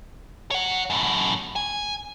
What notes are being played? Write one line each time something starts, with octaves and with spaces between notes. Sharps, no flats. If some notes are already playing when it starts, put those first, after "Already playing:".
C#5 F#5
F#2 A2
G#5